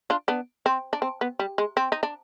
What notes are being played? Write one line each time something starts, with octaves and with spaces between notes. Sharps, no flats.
D4 F4
B3 D4
C4
D4
C4
B3
G3
G#3
C4
D#4
D4